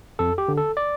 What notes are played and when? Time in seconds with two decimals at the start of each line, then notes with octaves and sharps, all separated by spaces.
0.19 F2 A4
0.38 G4
0.48 D3
0.57 A4
0.77 D5